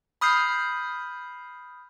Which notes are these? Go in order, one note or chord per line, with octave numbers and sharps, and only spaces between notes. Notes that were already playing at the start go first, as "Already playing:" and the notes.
B5 D#6 F6 G6 C7